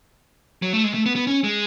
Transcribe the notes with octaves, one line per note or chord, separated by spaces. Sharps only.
F#3
A3
G#3
A3
B3
B3
C#4
G#3